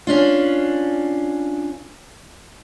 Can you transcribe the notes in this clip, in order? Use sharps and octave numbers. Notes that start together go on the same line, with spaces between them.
C#4 D4 F4